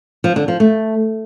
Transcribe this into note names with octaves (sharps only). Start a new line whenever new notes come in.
F3
D3
F3
A3